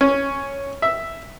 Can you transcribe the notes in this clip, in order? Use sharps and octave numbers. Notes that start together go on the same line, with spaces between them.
C#4
E5